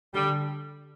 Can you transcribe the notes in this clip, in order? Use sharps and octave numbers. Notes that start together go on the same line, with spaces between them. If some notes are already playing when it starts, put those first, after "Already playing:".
D3 G3